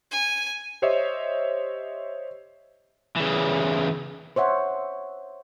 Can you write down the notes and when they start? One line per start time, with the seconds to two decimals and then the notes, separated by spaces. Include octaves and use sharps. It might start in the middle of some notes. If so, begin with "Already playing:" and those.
0.11 G#5
0.82 G4 C5 C#5 D#5 E5
3.16 C#3 E3
4.36 C5 C#5 E5 F#5